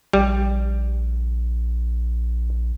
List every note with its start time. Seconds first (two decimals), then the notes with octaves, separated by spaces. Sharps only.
0.13 A#1 G3